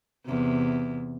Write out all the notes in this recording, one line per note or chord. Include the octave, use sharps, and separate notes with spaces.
E2 C3